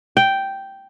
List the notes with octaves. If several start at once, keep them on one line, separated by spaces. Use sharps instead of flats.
G5